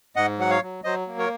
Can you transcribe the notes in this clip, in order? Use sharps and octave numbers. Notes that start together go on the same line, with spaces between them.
G#2 D#5 F#5
F#3 F#5
C#5 F5
F#3
F#3 C5 D#5
A#3
A#4 C#5